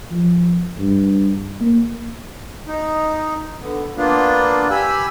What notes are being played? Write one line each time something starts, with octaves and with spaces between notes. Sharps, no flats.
F3
G2
A#3
D#4
D3 B3
A#3 B3 D4 F4
G4 G#5 B5 E6